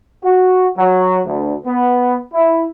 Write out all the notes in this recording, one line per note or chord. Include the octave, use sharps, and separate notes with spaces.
F#4
F#3
D2
B3
E4